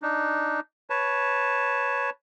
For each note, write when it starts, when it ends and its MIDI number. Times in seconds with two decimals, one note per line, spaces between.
0.02 0.60 62
0.02 0.60 63
0.90 2.10 71
0.90 2.10 73
0.90 2.10 81